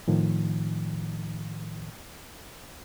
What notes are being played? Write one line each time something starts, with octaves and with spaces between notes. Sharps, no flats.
A2 D#3 F3